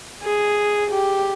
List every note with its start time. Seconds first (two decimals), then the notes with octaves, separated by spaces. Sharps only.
0.23 G#4
0.91 G4